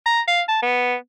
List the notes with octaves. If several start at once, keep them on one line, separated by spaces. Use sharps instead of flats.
A#5
F5
A5
B3